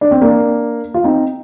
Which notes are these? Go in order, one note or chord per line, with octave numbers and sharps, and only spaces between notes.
D4
C4
A#3 D4
F4
C4 D#4